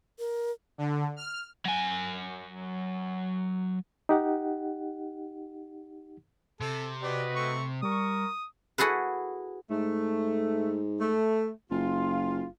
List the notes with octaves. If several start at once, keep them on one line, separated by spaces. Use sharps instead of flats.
A#4
D3
F6
F#3 G#5
D#4 G4 F#5
C3 A4
F#4 G4 B4 D5 D#5
A3 C4 C#6
G3 A#4 C#6 D#6
E4 F#4 G#4 A4 B4
G#2 A3
A3
F#1 F4